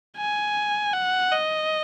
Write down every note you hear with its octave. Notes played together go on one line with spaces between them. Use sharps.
G#5
F#5
D#5